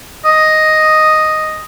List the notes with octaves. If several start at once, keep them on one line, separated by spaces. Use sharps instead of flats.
D#5